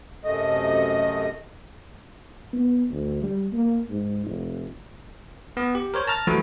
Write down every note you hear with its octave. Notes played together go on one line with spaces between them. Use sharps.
F#2 C3 A3 D#5
B3
D2
G3
A#3
G#2
F1
B3
G4
A#4 C5 C#5
A5 A#5 F6 A6
E3 F3 G3 A3 E4 F#4